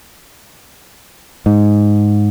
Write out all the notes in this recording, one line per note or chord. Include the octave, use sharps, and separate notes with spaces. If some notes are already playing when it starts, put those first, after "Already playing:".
G#2